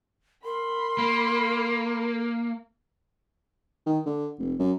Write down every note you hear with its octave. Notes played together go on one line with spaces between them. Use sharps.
A#4 B5 C6
A#3
D#3
D3
F1
F#2